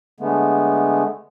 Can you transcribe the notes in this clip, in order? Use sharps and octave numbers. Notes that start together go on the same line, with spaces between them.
D3 G#3 A3 B3